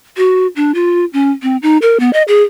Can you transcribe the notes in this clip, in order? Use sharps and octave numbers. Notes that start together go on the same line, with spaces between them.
F#4
D4
F4
C#4
C4
D#4
A#4
B3
D#5
G#4